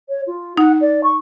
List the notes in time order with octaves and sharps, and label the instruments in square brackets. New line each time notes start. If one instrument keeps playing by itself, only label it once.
[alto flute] C#5
F4
[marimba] D#4 [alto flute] F#5
[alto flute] D5
C#6